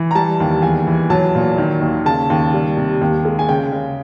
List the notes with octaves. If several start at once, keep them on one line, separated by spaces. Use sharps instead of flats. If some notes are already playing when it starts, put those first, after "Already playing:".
Already playing: E3
A#5
G3 A5
D#2
E2 G#5
E3
F#3 A5
A#2
D#3
D#2
C#3 A5
D#2
G3
C3
D#2
G#3
G#5
C#3 G5
C#3